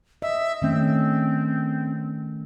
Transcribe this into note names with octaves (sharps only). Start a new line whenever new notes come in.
D#5 E5
D#3 A3 C4 C#4